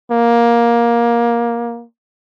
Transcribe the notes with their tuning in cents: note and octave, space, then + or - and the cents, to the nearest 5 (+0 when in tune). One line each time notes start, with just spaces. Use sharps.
A#3 +15